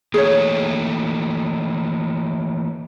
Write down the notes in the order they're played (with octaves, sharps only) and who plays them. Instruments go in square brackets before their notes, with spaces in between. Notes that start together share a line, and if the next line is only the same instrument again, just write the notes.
[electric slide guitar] E3 A3 A#3 [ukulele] G#4 C#5